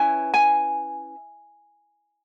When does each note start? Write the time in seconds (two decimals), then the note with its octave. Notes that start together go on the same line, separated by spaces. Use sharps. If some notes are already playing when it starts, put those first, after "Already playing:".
Already playing: C#4 E4 B4 G#5
0.34 G#5